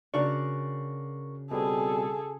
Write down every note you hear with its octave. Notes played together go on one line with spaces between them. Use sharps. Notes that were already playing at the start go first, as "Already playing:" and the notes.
C#3 D4 F#4 A#4 C#6
B2 G3 C4 G#4 A4